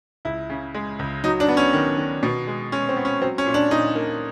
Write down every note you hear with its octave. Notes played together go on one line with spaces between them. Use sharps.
C#2 E4
C#3
G#3
C#2
F#3 D#4
D4
B3
C#4
D#3
D#3
B2
G#3
G#3 C#4
C4
B3
C#4
F#3 C4
C#4
A#2
D4
A#2 D#4
A#3